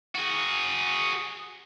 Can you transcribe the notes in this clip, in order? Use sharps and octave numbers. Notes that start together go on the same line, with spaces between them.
F#4 G#4